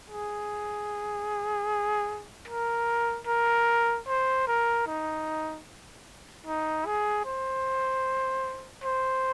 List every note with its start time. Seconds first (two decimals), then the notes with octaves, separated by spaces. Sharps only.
0.10 G#4
2.48 A#4
3.27 A#4
4.07 C5
4.47 A#4
4.87 D#4
6.46 D#4
6.86 G#4
7.25 C5
8.84 C5